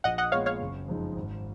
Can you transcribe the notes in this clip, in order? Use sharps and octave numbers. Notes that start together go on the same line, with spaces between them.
A#1 D#5 F#5
D#5 F#5
A#2 G#3 B3 C#5 F5
C#5 F5
F#1
F2 F3 G#3 D#4
G#1